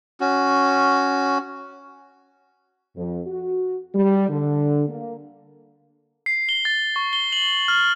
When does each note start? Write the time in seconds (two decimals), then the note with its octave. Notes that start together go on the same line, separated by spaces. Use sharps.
0.20 C#4 F#4
2.96 F2
3.27 F#4
3.95 G3
4.29 D3
4.88 A#3
6.26 C7
6.49 G7
6.65 A6
6.96 C#6
7.13 G7
7.32 F#7
7.68 F6